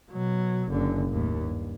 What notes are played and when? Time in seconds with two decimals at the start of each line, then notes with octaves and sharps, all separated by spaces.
0.11 B2 F#3
0.69 F#1 D3
1.09 D#2 A2
1.42 G2